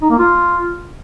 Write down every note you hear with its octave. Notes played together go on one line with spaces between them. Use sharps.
D#4
A#3
F4